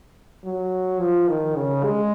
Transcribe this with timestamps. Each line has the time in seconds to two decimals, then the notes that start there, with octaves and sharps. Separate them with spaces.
0.44 F#3
1.00 F3
1.28 D#3
1.56 C#3
1.84 G#3